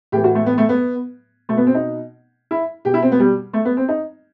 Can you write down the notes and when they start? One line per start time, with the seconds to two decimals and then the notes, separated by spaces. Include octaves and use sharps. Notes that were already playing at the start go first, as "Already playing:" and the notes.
0.12 A2 E3 G4
0.24 F#4
0.35 A3
0.46 B3
0.58 A3
0.69 B3
1.49 B2 A3
1.57 B3
1.67 C4
1.74 D#4
2.51 E4
2.85 B2 G4
2.94 E4
3.02 C4
3.12 B3
3.20 G3
3.53 A3
3.65 B3
3.77 C4
3.89 D#4